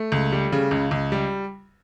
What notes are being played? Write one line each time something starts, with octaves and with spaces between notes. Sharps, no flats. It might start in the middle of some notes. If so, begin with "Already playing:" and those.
Already playing: A3
C#2
G3
C#3
C#2
C#2
G3